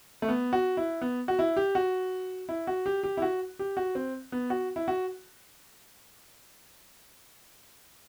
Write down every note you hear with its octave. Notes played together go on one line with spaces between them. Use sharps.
A3
B3
F#4
E4
B3
F#4
E4
G4
F#4
E4
F#4
G4
G4
E4
F#4
G4
F#4
C4
B3
F#4
E4
F#4